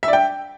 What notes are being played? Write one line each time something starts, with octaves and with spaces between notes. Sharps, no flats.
E5
D5
G5